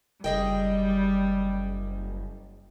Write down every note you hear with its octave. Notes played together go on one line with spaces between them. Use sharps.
F#1 G3 G#4 D#5 G5